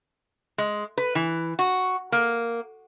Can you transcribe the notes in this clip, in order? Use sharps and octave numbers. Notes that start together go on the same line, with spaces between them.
G#3
B4
E3
F#4
A#3